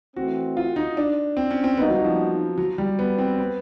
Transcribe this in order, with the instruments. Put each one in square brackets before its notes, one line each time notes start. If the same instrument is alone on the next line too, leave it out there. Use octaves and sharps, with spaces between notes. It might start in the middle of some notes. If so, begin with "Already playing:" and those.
[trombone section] E3 A3 C4 [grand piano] F#4
[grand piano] F4
D#4
D4
C4
C#4
C4
[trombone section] G3 A#3 D#4 F#4 [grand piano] B3
[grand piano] F#3
F3
F#3
G3
B3
C4
B3